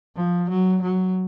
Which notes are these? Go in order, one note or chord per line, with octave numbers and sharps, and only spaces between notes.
F3
F#3
F#3